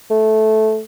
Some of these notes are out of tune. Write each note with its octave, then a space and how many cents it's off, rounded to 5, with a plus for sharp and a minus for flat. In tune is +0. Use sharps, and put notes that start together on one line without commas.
A3 -10